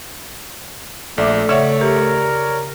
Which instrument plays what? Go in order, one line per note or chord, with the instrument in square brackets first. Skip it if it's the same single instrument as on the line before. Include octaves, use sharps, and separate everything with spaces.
[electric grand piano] A#1 [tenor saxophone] A3 [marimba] D5 E5 D6
[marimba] C#3 E5 F#5 [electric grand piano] C#5 D5 C#6
[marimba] G4 [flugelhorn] A#4